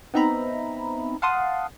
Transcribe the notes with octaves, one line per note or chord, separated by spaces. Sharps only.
B3 C4 D#4 E5 A#5 B5
F5 F#5 A5 C6 D#6